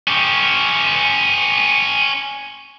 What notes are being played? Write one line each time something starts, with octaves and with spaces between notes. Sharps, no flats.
C#4 G4